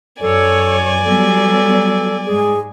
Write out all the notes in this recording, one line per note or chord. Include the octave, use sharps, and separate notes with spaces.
F#2 A4 C#5 D5 G#5
F#3 G3 B3 A4
G#2 G#3 G#4